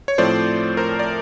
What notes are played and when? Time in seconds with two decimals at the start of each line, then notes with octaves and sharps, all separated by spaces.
0.08 C#5
0.18 A2 F3 A3 C4 C5 D5
0.77 A#4 C5
0.99 D5